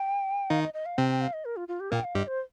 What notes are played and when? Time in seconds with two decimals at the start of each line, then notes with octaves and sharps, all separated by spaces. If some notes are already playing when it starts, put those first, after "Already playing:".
Already playing: G5
0.50 D#3 D#4 F5
0.62 D#5
0.74 D#5
0.86 F5
0.98 C3 C4 G5
1.09 G5
1.21 F5
1.33 D#5
1.45 A#4
1.57 F4
1.68 F4
1.80 G4
1.92 A#2 A#3 G5
2.04 F5
2.15 G2 G3 D#5
2.27 C5